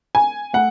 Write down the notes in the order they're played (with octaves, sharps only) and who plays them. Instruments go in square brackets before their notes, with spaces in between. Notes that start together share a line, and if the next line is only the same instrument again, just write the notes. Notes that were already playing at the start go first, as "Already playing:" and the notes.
[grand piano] G#5
A3 F#5